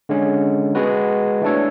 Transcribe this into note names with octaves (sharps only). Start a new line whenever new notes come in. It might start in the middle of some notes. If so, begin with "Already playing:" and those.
D3 G#3 C#4
G#3 B3 F#4 B4
E3 A3 D4 A4 C#5